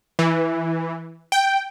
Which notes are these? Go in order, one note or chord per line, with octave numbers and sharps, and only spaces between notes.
E3
G5